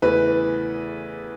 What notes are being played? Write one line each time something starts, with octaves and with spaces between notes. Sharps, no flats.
E2 C#3 E3 A3 E4 B4